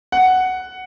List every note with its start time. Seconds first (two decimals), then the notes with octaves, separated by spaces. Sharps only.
0.12 F#5